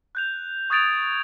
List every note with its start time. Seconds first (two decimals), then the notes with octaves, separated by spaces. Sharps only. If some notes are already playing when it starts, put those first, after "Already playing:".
0.15 F#6 G6 F7
0.70 C#6 D#6 G#6 A6 D7 F7